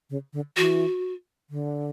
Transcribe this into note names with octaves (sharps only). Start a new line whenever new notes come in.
C#3
D3
E3 F#4
D3